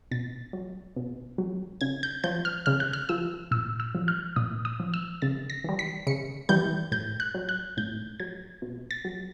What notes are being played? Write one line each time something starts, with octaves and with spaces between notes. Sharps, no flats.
B2 A6
F#3
B2
F#3
C#3 G#6
G6
F3 G6
F6
C#3 F6
F#6
F6
F3 E6
A#2 E6
E6
F3
F6
A#2 D#6
D#6
F3
E6
C#3 A6
A#6
E3 G3
B6
C#3 C#7
E3 G3 G6
A2 G6
F#6
F#3
F#6
A2 G6
F#3 G#6
B2
A6
F#3